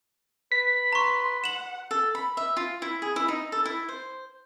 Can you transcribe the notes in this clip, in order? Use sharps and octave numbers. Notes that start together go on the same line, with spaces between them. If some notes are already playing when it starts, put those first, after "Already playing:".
B4 B6
A#5 C6 C#6
F#5 E7 F#7
A4
B5
E5
F4
E4
G#4
E4
D#4
A4
E4
C5